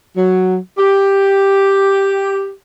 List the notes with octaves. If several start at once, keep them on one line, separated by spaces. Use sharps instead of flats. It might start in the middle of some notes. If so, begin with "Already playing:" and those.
F#3
G4